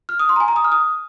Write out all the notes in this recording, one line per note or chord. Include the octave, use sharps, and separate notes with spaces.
F6
D#6
C6
A#5
G#5
A#5
D#6
F6
D#6